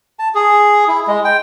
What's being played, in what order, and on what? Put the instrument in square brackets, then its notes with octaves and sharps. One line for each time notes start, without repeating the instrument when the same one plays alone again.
[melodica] A5
G#4
E4
G#3
G5